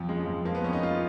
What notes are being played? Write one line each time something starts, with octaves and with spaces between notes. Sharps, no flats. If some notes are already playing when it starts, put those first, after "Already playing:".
Already playing: F2 F3
C#3 G#3
F2
F3 A#3
B3
F2 C#4
D#4
C#3 F4